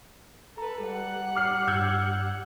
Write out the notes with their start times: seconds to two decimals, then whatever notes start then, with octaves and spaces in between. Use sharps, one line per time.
0.58 A4 B4 A#5
0.86 G3 F#5 F#6
1.35 D6 F6 C7
1.67 G2 E6 G6 G#6